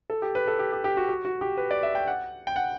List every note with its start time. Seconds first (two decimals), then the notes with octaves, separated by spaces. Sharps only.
0.10 A4
0.22 G4
0.35 B4
0.47 A4
0.59 G4
0.72 G4
0.84 G4
0.97 F#4
1.09 F#4
1.25 F#4
1.41 G4
1.57 B4
1.71 D5
1.83 E5
1.95 G5
2.07 F#5
2.47 G5
2.56 F#5